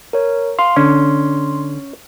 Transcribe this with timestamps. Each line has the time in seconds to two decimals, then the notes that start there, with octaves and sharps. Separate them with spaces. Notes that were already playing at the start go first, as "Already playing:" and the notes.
0.13 A#4 C#5
0.59 F5 C6
0.76 D3 C#4